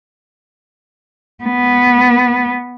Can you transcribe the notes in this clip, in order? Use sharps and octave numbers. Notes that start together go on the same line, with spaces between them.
B3